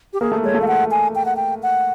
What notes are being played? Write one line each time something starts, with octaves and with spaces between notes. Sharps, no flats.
G4
A#3 G#4
A3
G#3 C#5
A3
F5
F#5
G#5
G5
F#5
G5
F#5